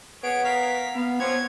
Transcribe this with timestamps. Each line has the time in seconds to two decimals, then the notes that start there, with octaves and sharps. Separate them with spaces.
0.23 B3 G#4 C#5 D7
0.45 A#4 F5 B6
0.95 B3 F5
1.20 F3 C4 C#5 F#5 G#6